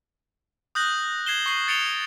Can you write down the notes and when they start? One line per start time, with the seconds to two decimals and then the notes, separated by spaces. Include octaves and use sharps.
0.75 D#6 F#6 G6 A#6 F#7
1.26 G#6 C7 E7 G7
1.46 C#6 C7 F#7
1.68 A6 C#7 D7 F7 G7